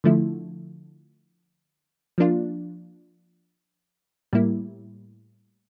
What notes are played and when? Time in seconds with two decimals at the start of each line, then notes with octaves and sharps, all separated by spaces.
0.04 D3 F3 A3 E4
2.18 F3 A#3 D4 F4
4.33 A2 G3 A#3 E4